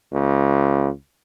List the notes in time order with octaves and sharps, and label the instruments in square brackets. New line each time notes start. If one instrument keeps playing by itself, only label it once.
[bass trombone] C#2